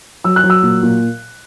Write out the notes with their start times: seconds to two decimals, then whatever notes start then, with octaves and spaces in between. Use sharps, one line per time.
0.24 F#3 E6
0.36 F#6
0.44 F#3
0.50 E6
0.63 A#2
0.83 A#2